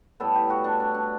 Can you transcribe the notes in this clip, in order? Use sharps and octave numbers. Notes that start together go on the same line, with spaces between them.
A2 G3 B3 A4
G4
F#4
D4
D4
D4